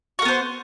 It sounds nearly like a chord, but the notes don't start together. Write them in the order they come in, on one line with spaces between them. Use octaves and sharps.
F#4 A#4 B3 C5